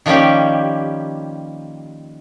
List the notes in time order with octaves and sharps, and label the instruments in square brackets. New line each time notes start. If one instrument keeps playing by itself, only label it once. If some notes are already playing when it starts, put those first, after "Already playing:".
[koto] D#3 F3 G3 A#3 C#4 G4